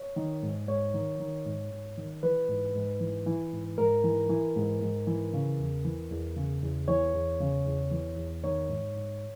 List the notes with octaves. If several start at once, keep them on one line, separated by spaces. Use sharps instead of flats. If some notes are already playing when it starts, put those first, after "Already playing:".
Already playing: C#5
D#3
G#2
G#2 C#5
D#3
D#3
G#2
G#2
D#3
E3 B4
G#2
G#2
E3
E3
G#2
G#2 A#4
E3
E3
G#2
G#2
E3
C#3
E2
E3
E2
C#3
E2
E3 C#5
E2
C#3
E2
E3
E2
D#3 C#5
G#2
G#2